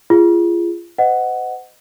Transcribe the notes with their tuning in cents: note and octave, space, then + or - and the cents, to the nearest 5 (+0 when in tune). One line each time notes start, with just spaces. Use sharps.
F4 -30 G#4 -10
C5 -40 D#5 +0 F#5 +5